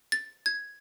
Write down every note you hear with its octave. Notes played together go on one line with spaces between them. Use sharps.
A6
G#6